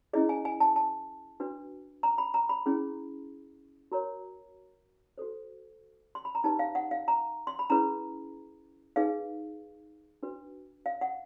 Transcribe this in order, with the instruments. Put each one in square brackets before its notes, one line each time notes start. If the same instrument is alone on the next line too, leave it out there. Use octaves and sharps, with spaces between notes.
[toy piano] C#4 E4 G#4 D#5
G#5
G#5
A5
A5
D4 F#4 B4
A#5
B5
A#5
B5
C#4 E4 G#4
F#4 A#4 C#5 A#5
F#4 A4 C5
C6
B5
A#5
D#4 G4 B4 A5
F5
F#5
F5
A#5
C6
B5
C#4 E4 G#4 B4 A#5
D#4 G#4 B4 F5
D4 F#4 B4
F5
F#5